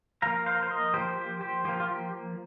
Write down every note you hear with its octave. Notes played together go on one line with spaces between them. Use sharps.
F3 A#3 F5 A#5
C5 F5
A#4
C5
A#4 D#5
F3 A#3 G4 C5
G4
G4 C5
F3 A#3 G4
F4
G4